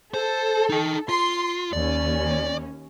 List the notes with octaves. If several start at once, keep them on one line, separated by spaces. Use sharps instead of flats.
A4 C5
D#4 G5
F4 C6
D#2 C#4 D5